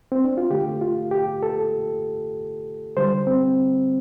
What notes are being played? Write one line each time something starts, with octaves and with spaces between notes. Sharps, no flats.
C4
D4
F4
D3 A3 G4
F4
G4
A4
D3 G3 C5
C4